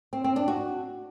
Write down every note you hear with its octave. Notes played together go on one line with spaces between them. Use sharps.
C4
C4
D4
F#4